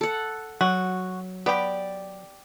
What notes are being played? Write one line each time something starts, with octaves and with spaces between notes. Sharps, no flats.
A4 F#5
F#3 F#4
B3 G4 D5